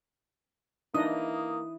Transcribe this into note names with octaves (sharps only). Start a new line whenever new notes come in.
E3 A#3 D4 D#4 D#5 D#6